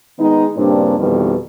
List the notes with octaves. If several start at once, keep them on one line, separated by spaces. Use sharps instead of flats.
D#3 G#3 B3 D#4
G2 A#2 C#3 G3 C4 D4
F2 B2 D#3 E3 G3